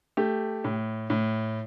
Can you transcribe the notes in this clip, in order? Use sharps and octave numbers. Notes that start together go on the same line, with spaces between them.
A3 G4
A2
A2